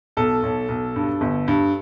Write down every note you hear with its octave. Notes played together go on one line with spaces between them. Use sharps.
B1 A4
B1
B1
G2
G1
G2